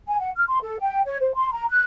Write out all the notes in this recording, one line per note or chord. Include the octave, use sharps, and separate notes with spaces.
G#5
F#5
F6
C6
A4
G5
C#5
C5
C6
A#5
F#6